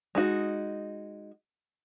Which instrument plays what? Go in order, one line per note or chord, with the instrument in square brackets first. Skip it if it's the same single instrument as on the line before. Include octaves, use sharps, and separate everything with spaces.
[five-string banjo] G#3 D#4 F#4